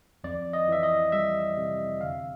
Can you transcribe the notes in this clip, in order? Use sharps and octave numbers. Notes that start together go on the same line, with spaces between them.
F2 D5
D#5
E3 E5
D#5
G3 E5
C3
D3 F5